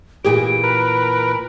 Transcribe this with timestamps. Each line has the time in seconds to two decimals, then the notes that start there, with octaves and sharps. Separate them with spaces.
0.25 A#2 E3 G4 G#4 D7
0.64 A#4 B4